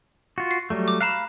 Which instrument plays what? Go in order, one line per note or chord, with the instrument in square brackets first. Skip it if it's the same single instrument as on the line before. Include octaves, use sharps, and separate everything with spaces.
[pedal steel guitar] F4 F#4
[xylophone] C7
[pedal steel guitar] F#3 G3 A3
[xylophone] D6
[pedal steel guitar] F5 A#5 B5 [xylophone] F#6 C7 E7